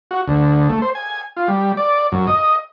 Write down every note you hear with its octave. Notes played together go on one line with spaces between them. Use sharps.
F#4
D2
A3
C5
G#5
F4
G3
D5
F#2
D#5